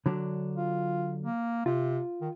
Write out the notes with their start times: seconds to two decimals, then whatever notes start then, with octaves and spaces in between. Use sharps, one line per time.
0.06 D3 F#3 D4
0.56 F4
1.24 A#3
1.66 C3 F4
2.21 D#3